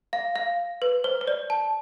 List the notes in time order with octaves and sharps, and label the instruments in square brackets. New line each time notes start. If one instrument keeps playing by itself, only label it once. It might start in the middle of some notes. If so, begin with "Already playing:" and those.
[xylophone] F5
F5
B4
C5
C5
D5
A5